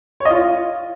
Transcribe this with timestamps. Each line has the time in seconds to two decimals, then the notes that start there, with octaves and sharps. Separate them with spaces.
0.20 C#5
0.25 D#5
0.30 F4